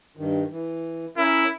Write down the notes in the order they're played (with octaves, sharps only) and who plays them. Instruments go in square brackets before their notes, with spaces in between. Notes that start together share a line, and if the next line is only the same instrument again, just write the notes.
[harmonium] G2 D#3
E3
[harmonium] C#4 A#4 [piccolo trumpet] E4